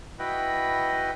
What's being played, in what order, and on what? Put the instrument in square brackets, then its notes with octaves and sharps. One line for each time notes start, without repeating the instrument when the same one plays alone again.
[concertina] E4 F#4 B4 D#5 G5